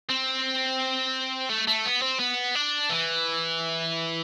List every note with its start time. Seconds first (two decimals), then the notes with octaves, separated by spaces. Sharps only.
0.09 C4
1.49 A3
1.68 A3
1.86 B3
2.02 C4
2.20 B3
2.55 D4
2.90 E3